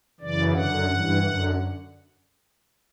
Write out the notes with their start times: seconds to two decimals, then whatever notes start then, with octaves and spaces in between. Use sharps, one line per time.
0.20 F#2 C#3 E3 D5
0.53 F#2 D3 F#5
0.86 G2 E3
1.18 F#2 D3